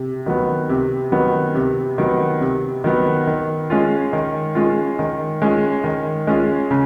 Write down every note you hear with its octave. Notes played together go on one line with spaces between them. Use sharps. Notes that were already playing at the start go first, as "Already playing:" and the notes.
Already playing: C3
D#3 F#3 B3
C3
D#3 F#3 B3
C3
D#3 F#3 B3
C3
D#3 F#3 B3
D#3
G#3 C#4 F4
D#3
G#3 C#4 F4
D#3
G#3 C#4 F4
D#3
G#3 C#4 F4
C#3